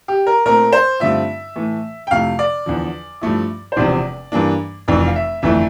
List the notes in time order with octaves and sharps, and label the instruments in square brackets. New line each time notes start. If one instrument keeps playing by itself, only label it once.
[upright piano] G4
A#4
[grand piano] A#2 A3 C4 [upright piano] A#4
[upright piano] C5
[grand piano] G2 D3 A3 C4 F4 [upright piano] E5
[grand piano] A2 E3 A3
[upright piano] G5
[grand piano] F2 C3 F3 A3 E4 [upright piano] F5
[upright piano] D5
[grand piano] E2 D3 F3
G2 F3 A3 E4
[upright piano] C5
[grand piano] E1 E2 C3 F3 C4 [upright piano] D5
[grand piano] G2 E3 A#3 D4
[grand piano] F1 F2 E3 [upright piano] D5
[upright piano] F5
E5
[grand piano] G1 F2 E3 A3 E4 [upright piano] E5